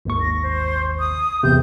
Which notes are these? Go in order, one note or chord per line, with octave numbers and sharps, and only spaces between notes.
G#1 D#2 C#6
A#6
C5
D#6
G1 E2 C3 G6